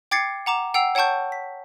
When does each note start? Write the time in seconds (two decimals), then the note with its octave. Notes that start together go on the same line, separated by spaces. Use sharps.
0.11 G5 D6 G#6 A6 C7 C#7
0.46 F#5 A#5 D6 E7
0.74 F#5 G5 E6 C7 F7
0.95 C#5 F#5 G5 A5 C#6 G6
1.32 B6